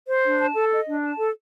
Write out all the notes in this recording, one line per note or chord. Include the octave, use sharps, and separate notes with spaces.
C5
D4
A5
A4
D#5
D4
A5
A4